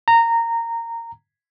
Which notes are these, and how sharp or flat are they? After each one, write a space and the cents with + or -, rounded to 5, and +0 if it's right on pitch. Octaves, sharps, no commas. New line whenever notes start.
A#5 -15